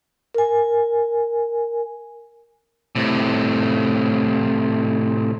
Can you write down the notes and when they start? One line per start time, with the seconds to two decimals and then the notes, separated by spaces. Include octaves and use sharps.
0.34 A#4 G#5
2.96 A2 C3